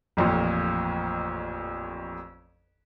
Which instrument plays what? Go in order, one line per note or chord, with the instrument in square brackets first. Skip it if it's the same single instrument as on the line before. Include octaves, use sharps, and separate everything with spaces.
[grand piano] A1 F2 A#2